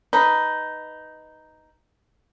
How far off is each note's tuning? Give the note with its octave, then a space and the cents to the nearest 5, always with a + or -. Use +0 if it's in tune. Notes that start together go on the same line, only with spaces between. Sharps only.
D#4 +0 B4 +0